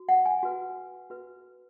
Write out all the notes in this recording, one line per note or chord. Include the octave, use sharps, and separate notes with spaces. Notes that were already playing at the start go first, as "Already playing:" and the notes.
Already playing: F#4
F#5
G#5
F#4 B4
F#4 B4